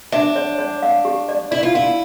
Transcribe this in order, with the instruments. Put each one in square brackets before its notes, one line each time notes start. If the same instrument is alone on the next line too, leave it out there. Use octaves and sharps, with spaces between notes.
[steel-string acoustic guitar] D4 [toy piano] E5
[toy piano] C#5
C#5
F5
G4
D5
[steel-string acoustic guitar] E4 [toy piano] D5
[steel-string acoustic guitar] F4
[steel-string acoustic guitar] E4 [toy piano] F5